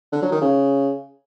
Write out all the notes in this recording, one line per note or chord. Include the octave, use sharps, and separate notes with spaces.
D3
F#3
D#3
C#3